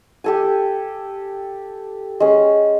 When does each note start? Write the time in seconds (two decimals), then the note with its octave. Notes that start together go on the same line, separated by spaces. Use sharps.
0.24 G4 A4 G#5
2.20 G#3 C#4